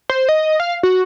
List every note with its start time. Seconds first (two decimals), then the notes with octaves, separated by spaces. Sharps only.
0.09 C5
0.29 D#5
0.60 F5
0.83 F#4